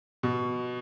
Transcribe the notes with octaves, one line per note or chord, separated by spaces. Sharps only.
B2